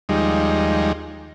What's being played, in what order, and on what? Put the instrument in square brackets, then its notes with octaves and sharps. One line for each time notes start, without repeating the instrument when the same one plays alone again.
[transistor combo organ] D#2 F3 G3 G#3 D#4